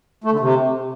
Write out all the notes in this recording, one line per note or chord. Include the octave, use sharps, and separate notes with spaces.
A3
D3
C3